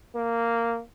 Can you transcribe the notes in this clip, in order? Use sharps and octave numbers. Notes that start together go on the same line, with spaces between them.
A#3